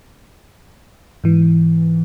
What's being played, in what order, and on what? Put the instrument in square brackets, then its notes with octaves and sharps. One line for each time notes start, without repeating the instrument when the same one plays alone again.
[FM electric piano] G#2 E3